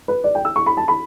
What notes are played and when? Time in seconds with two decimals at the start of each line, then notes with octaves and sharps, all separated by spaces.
0.08 B4
0.24 D5
0.35 G5
0.45 E6
0.56 C#6
0.66 B5
0.77 A5
0.88 B5